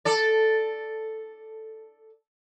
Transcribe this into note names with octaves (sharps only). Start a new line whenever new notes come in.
A4 D5